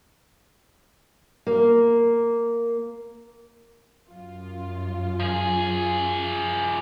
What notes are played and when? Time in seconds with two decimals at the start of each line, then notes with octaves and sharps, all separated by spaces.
1.47 A#3
4.10 F#2 F4
5.20 F3 G#4